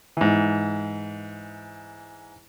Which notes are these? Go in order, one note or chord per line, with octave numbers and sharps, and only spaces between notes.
G#2 E3